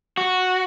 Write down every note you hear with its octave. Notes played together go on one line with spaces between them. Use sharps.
F#4